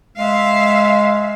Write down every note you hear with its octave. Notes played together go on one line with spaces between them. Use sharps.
G#3 E5 F5